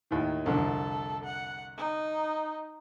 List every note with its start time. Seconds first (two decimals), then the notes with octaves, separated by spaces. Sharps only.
0.11 D#2 A2 D#3
0.46 C2 F2 D3 A4
1.24 F#5
1.77 D#4